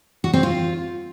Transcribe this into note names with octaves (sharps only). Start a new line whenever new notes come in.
F#4
C4
F4